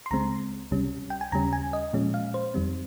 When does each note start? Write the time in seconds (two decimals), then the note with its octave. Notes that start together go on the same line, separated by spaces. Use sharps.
0.06 C6
0.11 C#2 C#3 G#3 C4 A#5
0.71 C#2 C3 G3 C#4
1.10 G5
1.21 G#5
1.32 D#2 C#3 G3 C#4 A#5
1.53 G#5
1.73 D#5
1.93 A#2 F3 G#3 C#4
2.14 F5
2.34 C5
2.54 F2 D#3 G3 C4